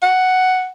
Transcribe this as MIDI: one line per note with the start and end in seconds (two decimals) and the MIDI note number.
0.02 0.70 78